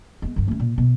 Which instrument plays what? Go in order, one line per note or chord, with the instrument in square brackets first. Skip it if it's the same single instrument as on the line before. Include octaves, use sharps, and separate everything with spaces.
[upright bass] G#3 B3
G2 D3
A3 C#4
A#2
B2